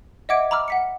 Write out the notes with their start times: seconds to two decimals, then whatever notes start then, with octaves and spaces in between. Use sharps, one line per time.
0.29 D#5 E5 F#5 D6 G#6 D7
0.51 A#5 B5 D6 E6 F6
0.68 F#5 B6 C#7